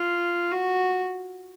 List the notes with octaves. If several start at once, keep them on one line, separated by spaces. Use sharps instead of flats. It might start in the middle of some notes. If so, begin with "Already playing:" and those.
Already playing: F4
F#4